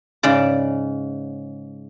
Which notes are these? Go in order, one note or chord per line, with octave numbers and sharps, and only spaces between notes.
G#2 C#3 D5